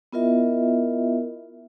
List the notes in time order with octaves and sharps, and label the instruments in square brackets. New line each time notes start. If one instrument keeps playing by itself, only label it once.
[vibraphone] B3 E4 F4 A#4 D#5 E5